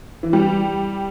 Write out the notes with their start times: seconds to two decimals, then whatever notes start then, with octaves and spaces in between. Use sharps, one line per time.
0.23 E3
0.33 G3